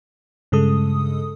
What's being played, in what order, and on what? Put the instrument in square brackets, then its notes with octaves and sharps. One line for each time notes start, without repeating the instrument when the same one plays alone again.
[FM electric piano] G2 C#3 G#3 A4 D#6